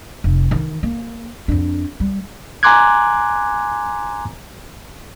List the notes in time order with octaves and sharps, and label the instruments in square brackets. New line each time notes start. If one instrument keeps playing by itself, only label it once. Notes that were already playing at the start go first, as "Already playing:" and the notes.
[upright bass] F1
D#3 E3
A#3
F2 D4
G3
[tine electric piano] G#5 A#5 C6 D6 F#6 G#6